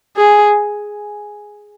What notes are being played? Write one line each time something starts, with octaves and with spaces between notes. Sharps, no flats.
G#4